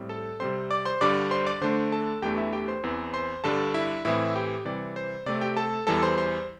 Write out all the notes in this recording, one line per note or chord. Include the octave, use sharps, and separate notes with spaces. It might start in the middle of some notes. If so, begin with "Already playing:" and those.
Already playing: A2 G3 C4
A4 A5
C3 G3 C4 C5 C6
D5 D6
C5 C6
G2 D3 G3 D4 D5 D6
C5 C6
D5 D6
D3 A3 D4 C5 C6
A4 A5
E2 E3 A3 D4 G4 G5
E4 E5
G4 G5
C5 C6
E2 E3 C4
C5 C6
G2 D3 G3 D4 A4 A5
E4 E5
A2 E3 C4 E4 E5
G4 G5
C3 E3 G3 C4 D5
C5
C3 A3 C4 D5
G4 G5
A4 A5
E2 E3 G3 A4 A5
C5 C6
C5 C6